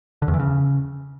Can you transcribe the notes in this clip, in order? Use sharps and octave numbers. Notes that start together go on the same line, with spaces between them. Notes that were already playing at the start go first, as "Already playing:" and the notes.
D3
E2
E3
C#3